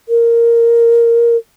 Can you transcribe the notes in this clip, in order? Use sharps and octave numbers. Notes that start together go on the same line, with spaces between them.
A#4